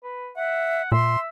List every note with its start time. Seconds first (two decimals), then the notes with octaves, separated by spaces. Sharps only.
0.04 B4
0.37 E5 F#5
0.92 A#2 E5 C6